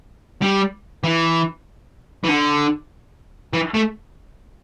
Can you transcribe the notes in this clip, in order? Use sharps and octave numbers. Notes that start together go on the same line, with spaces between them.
G3
E3
E3
D3
E3
A3